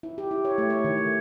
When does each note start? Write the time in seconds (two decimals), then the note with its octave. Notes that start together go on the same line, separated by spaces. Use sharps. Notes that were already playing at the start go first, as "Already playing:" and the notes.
0.03 E4
0.18 G4
0.31 E4
0.45 C#5
0.58 A3
0.70 C#5
0.84 D#3
0.98 A3